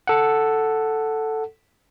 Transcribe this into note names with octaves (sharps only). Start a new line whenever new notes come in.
A4 F#5